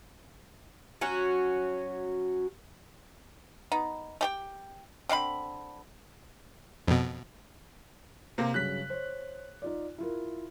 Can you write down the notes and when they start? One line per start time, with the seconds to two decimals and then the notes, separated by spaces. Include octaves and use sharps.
1.01 F#3 C#4 F#4
3.72 B3 D#4
4.21 A3 G4 G5
5.09 D3 C4 F5 B5
6.87 F2 B2
8.38 C3 A#3
8.54 G2 C#3 F#3 F#6 B6
8.90 C5 C#5
9.62 D#4 F4 D5
9.98 E4 F4 A#4